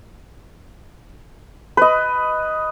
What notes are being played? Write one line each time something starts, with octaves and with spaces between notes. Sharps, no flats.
B4 D#5